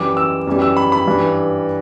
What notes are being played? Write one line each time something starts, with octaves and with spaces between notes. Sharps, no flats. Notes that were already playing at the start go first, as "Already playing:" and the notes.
Already playing: F#2 E3 G3 D6
E6
F#2 E3 G3
E6
B5
B5
G2 E3 G3